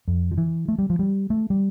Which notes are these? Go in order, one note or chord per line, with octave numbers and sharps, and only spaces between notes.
F2
F3
E3
A3
G3
F3
G3
A3
G3